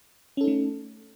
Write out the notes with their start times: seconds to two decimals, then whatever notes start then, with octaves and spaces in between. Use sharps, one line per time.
0.37 C#4
0.41 A4
0.44 D#4
0.48 A3